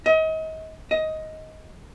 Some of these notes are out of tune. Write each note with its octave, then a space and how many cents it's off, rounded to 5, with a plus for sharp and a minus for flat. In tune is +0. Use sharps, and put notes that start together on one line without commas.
D#5 +35
D#5 +15